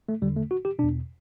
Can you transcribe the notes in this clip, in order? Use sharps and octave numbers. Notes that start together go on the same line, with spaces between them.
A3
E2 D3 G3
A3
F#4
G4
E2 B2 D4